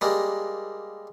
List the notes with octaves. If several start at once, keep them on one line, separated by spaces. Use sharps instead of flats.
G3 G#3 A#3